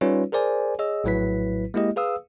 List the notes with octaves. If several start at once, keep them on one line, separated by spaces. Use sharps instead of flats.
G3 C#4 D#4 F4 B4 C#5
G#4 A#4 C5 D5 G#5
G#4 C#5 D#5 E6
A#1 A2 F#3 E4 B4 B6
G#3 A#3 E4 G4 D#5
G#4 B4 F5 D#6 E6